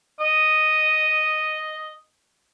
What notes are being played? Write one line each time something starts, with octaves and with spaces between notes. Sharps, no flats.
D#5 D#6